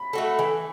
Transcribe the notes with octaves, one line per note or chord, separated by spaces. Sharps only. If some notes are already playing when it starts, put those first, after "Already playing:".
Already playing: B5
A3 F#4 A4
E3